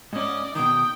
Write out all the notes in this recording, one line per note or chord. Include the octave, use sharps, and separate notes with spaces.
G#2 C#4 D5 D#5
B2 D#3 G5 D#6